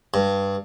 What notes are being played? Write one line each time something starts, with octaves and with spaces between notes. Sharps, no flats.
G2